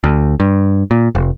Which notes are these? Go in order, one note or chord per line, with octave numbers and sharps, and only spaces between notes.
D2
G2
A#2
F1